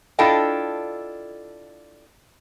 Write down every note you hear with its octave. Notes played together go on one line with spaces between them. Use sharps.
D4 E4 F4 A4 D#5 G5